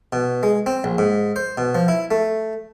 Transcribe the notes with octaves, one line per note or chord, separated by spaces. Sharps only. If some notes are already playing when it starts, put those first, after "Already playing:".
B2
G#3
C4
A#1
G#2
C5
B2
F3
E4
A3